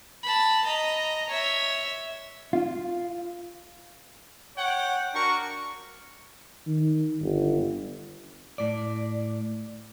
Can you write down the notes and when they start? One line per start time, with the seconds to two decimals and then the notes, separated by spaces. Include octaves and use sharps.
0.23 A5 B5
0.65 D#5 A#5
1.30 C#5 E5
2.53 F4
4.57 C#5 F#5 G5
5.14 D4 F#4 A#4 C#6
6.67 D#3
7.22 G1
8.58 A2 D5